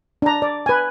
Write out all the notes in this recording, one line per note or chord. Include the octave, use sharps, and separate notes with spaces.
D4 A#5
D5
B4 G#5